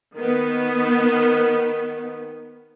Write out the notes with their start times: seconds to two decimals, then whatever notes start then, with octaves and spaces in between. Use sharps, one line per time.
0.17 D#3 B3